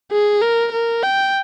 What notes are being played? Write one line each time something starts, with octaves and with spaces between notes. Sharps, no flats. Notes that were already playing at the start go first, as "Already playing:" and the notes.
G#4
A#4
A#4
G5